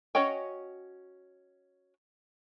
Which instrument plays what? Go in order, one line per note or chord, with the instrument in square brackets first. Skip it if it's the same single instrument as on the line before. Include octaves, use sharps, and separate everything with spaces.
[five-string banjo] C#4 F#4 C#5 D#5 G5